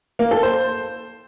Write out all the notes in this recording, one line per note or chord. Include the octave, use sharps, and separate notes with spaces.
A#3
A4
C5